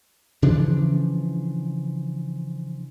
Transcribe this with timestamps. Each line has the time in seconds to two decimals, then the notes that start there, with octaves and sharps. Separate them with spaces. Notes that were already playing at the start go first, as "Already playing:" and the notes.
0.42 C#3 E3 F3 D4